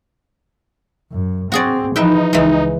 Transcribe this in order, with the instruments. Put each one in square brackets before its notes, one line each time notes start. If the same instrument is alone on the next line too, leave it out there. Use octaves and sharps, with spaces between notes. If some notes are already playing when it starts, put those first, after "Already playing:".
[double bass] F#2
[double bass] C4 [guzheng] F#4 G#4 D5
[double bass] E3 F3 [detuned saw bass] D#4 [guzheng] B4 E5 G5
[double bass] C#2 [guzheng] E3 G#3